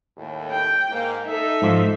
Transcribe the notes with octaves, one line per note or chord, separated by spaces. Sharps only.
D#2 A2
G5
G#2 A#3
D#4 A4 E5
G#2 F3